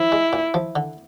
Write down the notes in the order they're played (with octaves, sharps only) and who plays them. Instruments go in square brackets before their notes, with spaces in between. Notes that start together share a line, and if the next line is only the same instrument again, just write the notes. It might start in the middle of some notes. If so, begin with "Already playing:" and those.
Already playing: [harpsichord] F3 [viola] E4
[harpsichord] G#3
A#2
F3
D3